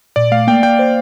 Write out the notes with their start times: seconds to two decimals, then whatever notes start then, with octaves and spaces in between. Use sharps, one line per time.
0.16 A#2 D5
0.32 A3 F5
0.48 A#3 G5
0.63 A#3 G5
0.79 C5